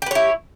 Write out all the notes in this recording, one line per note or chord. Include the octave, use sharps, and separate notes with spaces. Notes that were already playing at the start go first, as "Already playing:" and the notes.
E4 G4 B4 C#5